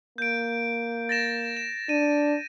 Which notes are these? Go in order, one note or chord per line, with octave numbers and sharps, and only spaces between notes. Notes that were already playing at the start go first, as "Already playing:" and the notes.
A#3 G6 D7
A6 A#6 E7
E7
D4 D#7